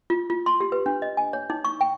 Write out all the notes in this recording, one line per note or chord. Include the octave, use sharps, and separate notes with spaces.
F4
F4
C6
G4
B4
D4
D#5
G#5
C#5
D#4
C#6
G5